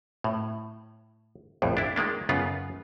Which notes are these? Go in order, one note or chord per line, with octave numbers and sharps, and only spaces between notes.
A2
A#1 F2 A2
D4 E4
D#3 G#3 A#3 D4
F#2 C#3 B3 F4